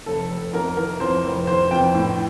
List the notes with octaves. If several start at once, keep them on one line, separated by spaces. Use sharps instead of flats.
F1 A4
F1
F2 A#4
E3 A#4
F2 C5
F1
E3 C5
F2 G5
A2